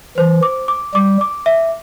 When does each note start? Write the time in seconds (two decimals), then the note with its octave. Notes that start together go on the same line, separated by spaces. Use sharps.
0.17 E3 C5
0.43 D6
0.68 D6
0.94 G3 D6
1.21 D6
1.46 E5